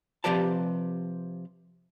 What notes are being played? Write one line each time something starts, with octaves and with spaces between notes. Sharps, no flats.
C3 F3 G4 B4 D5 A5